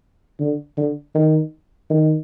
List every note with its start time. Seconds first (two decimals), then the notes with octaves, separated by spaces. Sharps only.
0.40 D3
0.77 D3
1.15 D#3
1.90 D#3